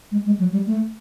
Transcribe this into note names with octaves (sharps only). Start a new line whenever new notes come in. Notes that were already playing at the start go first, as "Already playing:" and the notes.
G#3
G#3
F#3
G3
A3